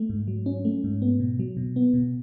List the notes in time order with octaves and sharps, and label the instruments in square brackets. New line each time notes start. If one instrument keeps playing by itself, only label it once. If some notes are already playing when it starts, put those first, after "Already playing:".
Already playing: [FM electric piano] A3
G#2
F#3
C#4
A3
G#2
B3
B2
F#3
B2
B3
B2